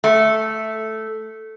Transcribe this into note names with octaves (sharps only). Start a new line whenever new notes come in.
A3